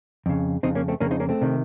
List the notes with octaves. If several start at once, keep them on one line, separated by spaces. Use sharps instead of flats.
F2 C#3
F2 C#3 C4 D#4
A#3 C#4
A3 C4
F2 C#3 A#3 C#4
C4 D#4
A#3 C#4
A3 C4
C3 D#3